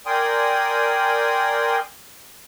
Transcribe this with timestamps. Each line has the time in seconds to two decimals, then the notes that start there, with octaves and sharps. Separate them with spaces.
0.06 A#4 D5 G5 G#5 C6 D#6